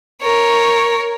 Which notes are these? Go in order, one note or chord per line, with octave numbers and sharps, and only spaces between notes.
A#4 C#5